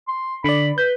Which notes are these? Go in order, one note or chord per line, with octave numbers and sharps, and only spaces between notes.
C6
D3 D5 B5
B4 G6